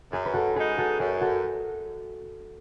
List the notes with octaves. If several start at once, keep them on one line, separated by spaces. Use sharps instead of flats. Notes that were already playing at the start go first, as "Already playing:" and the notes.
F#2 G#4
B4
F#4 A4
C#3 G#3 D#4 G#4 B4
F#4 A4
F#2 G#4
F#4 A4